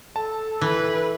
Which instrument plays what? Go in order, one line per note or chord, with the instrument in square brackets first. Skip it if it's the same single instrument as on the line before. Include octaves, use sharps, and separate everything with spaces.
[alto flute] A4 [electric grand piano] A5
[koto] E3 [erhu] B4